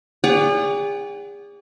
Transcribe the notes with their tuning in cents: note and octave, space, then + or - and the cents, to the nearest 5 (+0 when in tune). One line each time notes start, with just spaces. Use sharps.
G#4 -40 D5 -35 F#5 +30